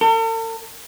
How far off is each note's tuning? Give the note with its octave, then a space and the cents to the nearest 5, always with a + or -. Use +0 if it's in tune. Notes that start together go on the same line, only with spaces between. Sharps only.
A4 +45